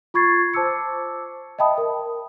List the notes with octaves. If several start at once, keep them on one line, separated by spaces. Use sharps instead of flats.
F4 B5 C#6 G#6 A6 C7
C5 A5 D6 E6 C#7
D#5 E5 G5 A5 B5 D#6
A#4